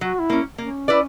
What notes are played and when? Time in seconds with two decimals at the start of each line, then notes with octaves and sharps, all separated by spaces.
0.01 F#3 F#4
0.20 E4
0.30 A#3 C#4
0.58 A#3 C#4
0.88 E4 B4 D5